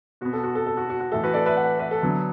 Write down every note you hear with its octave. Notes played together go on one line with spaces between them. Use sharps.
B2 B3 F#4
A4
F#4
A4
A4
F#4
F#4
F#4
A2 E3 A3 A4
F#4 B4
A4 D5
B4 E5
D5 F#5
B4 E5
A4
D3 F#3 B3